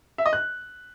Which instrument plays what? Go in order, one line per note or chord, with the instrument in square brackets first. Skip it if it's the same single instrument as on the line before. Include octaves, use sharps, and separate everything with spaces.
[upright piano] E5
D#5
F#6